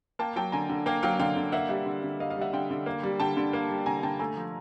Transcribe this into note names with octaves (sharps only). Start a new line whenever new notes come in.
A#3 G5 A5
F#3 G5 A5
D3 G#5 A#5
D3
A#3 F5 G5
F#3 F5 G5
D3 F5 G5
D3
A#3 E5 F#5
G3 E5 F#5
D3
D3
A#3 D#5 F5
D#5 F5
G3
E5 F#5
D3 F5 G5
D3
A#3
G3
D3 G5 A5
D3
A#3
G3
D3 G#5 A#5
D3 G5 A5
A3 G#5 A#5
F3